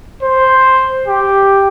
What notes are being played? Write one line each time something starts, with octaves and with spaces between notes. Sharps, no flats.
C5
G4